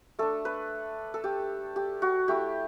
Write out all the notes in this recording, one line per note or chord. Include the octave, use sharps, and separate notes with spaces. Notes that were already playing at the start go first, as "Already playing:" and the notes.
A3 D4 A4
B4
A4
G4
G4
F#4
A3 E4 G4